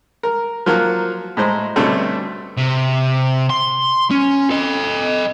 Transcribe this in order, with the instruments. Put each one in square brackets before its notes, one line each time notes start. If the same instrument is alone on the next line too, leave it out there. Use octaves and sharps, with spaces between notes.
[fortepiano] A#4
F3 F#3 A#3 F#4
A2 G#3 C5 A#5
G2 B2 D3 A3 C4 C#4
[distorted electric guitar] C3
C6
C#4
A4 D#5